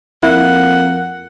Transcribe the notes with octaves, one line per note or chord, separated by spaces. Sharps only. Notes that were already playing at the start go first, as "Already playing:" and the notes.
F2 A#3 E4 F#5